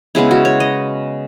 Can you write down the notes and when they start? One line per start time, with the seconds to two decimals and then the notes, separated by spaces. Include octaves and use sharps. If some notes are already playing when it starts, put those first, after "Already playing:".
0.15 C#3 G#3 B3 E4
0.31 F#4
0.45 C#5
0.60 D#5